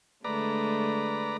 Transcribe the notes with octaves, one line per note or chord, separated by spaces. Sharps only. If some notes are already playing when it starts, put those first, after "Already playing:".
D3 G#3 A3 B4 D5 A#5